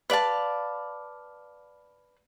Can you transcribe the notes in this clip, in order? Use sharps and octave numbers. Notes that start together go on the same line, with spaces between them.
B4 D5 F5 A5